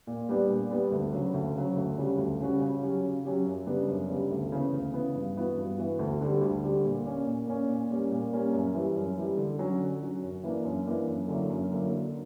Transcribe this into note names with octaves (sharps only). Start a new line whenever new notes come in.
A#2
G3 B3 D4
A#2
G3 B3 D4
D2
C#3 F#3
D2
C#3 F#3
D2
C#3 G3 C#4 F#4
D2
C#3 G3 C#4 F#4
C#3
F#3 C#4 G4
C#3
F#3 C#4 G4
F#2
C#3 G3 B3 D4
F#2
C#3 G3 B3 D4
D2
C#3 E3 B3
D2
C#3 E3 B3
G2
E3 B3 F#4
G2
E3 B3 F#4
D2
D3 G3
D2
D3 G3
A#2
A#3 C#4
A#2
A#3 C#4
A#2
G3 A#3 C#4
A#2
G3 A#3 C#4
F#2
E3 G3
F#2
E3 G3
D3
F#3 C#4 F#4
D3
F#3 C#4 F#4
F#2
E3 A#3 D4
F#2
E3 A#3 D4
F#2
D3 F#3 A#3 E4
F#2
D3 F#3 A#3 E4
D3